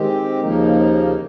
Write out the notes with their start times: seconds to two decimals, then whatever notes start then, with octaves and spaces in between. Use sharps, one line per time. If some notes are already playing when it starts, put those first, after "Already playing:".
Already playing: D#3 G#3 C4 G4
0.41 D#2 C#3 F3 A#3 D#4